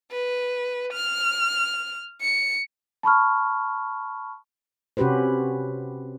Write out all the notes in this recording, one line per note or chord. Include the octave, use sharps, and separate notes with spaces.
B4
F6
C#7
A5 B5 C#6 F6
C3 C#4 F#4 G4 B4 C5